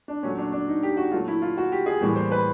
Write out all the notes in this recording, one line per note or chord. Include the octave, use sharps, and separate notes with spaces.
D4
A#2 F#3 A3 C#4
D4
D4
D#4
G4
F#4
A#2 F#3 A3 F4
E4
F4
F#4
G4
G#4
A2 E3 G3 A#3
C5
B4